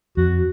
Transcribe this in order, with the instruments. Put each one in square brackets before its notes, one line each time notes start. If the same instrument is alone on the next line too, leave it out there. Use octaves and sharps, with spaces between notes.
[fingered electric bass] F2 [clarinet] F#4